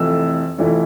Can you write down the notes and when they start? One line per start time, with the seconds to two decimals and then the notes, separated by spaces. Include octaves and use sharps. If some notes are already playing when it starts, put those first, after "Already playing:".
Already playing: F1 F2 E3 A3 E4 E6
0.58 F1 F2 E3 A3 E4